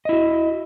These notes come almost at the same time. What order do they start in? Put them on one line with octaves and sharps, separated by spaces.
D#5 E4 F#4